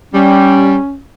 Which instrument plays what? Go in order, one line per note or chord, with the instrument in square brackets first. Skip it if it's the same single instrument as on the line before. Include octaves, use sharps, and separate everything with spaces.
[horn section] G3 [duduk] C#4